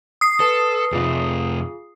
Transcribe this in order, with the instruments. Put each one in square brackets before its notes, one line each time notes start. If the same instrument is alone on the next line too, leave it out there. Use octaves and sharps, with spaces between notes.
[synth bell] D#6 C7
[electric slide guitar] A4 [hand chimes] B4 A5
[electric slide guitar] F2 C3 [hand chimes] F4 G#4